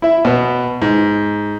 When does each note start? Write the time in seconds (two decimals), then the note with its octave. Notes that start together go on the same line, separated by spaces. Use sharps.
0.02 E4 E5
0.25 B2 B3
0.82 G#2